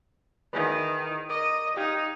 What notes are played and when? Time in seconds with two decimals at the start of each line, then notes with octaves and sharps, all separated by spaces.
0.53 D#3 E4 G#4 B4
1.30 A#4 D#5 D6 D#6
1.77 D#4 G4 F5 G#6